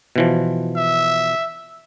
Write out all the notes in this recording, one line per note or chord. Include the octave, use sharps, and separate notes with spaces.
B2 E3 F3
E5